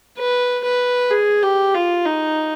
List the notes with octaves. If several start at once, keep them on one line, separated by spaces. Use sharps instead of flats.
B4
B4
G#4
G4
F4
D#4